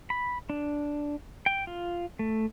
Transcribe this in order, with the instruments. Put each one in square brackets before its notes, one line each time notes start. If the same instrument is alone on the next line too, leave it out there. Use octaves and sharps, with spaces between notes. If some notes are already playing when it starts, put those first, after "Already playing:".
[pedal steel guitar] B5
D4
G5
F4
A3